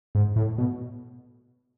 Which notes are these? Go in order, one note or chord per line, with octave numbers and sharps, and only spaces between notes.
G#2
A2
B2